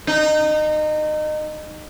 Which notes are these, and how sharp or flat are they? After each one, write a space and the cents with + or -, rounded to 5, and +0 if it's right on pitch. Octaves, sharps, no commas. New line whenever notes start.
D#4 -25